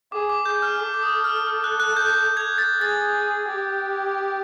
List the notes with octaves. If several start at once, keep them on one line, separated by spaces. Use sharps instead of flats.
G#4 D6
D6
G#4 G6
F6
A4 D6
D6
D#6
F6
F6
F#6
F#6
G6
G6
G#6
A6
G#4 A6
G4